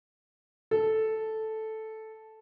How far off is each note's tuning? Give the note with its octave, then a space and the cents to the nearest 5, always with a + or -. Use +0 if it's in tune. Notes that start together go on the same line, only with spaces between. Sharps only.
A4 -5